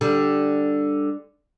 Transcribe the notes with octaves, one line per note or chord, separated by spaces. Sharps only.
D3 G3